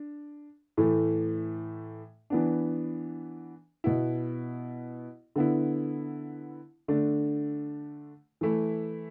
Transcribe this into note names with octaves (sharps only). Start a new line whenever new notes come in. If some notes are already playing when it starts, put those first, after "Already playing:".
Already playing: D4
A2 E3 A3
E3 B3 D4
B2 B3 E4
D3 B3 E4
D3 A3 D4
E3 A3 E4